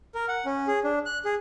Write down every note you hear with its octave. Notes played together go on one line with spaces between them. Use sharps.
A#4
F#5
C#4
G#4
D4
F#6
G#4